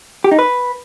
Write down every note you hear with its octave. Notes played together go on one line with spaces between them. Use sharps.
G4
D#4
B4